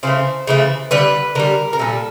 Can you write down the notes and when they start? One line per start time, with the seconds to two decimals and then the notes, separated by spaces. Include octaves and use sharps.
0.03 C#3 E3 A3 C5
0.47 C#3 E3 A3
0.91 D3 G3 B4
1.35 D3 G3 A#4
1.73 A#4
1.79 A#2 G3 A4